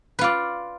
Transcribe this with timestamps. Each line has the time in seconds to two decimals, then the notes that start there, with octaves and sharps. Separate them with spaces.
0.19 B4
0.21 F4
0.24 D5